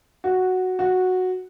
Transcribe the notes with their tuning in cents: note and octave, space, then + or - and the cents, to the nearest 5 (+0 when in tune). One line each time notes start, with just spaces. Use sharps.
F#4 +0
F#4 -5